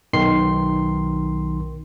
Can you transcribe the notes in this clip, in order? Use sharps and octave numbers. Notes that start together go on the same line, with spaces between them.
B1 D#3 C6 C7